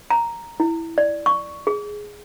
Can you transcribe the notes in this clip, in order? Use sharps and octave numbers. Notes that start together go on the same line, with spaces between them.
A#5
E4
D5
C#6
G#4